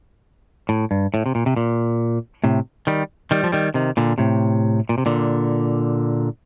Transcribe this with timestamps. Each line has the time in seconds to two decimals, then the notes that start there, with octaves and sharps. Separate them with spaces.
0.69 A2
0.91 G2
1.14 A2
1.26 C3
1.35 A#2
1.46 C3
1.56 A#2
2.44 A2 C3
2.87 D#3 G3
3.31 D#3 G3
3.44 F3
3.52 D#3 G3
3.74 C3 D#3
3.97 A#2 D3
4.18 A2 C3
4.89 A#2
4.98 C3
5.06 A#2 D3